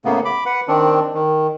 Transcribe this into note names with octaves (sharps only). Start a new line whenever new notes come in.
A2 C#3 A#3 B3
B5 D6
B4 F#5
D#3 C4 D4
D#3